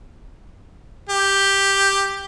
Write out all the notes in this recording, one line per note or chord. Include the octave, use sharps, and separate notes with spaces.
G4